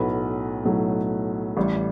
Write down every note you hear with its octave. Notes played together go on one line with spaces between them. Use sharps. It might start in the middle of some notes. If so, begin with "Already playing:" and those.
Already playing: B1 A2 F#3 A3 B4
B1 A2 F#3 A3
A1 A2 G3